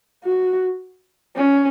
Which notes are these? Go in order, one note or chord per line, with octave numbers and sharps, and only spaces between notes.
F#4
C#4